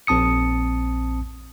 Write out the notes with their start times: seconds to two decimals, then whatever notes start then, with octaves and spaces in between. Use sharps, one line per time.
0.07 A#1 C4 A5 D#6 C#7